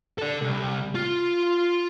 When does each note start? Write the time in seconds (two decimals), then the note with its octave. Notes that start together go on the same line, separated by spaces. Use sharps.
0.18 A4 D5
0.42 C2
0.95 F4